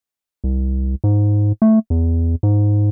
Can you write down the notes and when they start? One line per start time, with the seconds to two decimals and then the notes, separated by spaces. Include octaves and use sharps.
0.44 C2
1.04 G#2
1.62 A3
1.90 E2
2.43 G#2